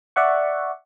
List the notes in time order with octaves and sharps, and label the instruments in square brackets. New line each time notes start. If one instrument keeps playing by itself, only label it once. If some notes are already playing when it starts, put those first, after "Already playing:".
[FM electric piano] D5 E5 F#5 C#6